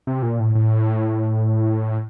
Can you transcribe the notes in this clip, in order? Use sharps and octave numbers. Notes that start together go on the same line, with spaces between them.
C3
A#2
A2
A2